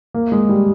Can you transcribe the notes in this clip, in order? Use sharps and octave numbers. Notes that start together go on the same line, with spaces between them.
A#3
G#3
G3